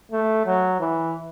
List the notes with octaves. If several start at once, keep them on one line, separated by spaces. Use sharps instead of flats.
A3
F#3
E3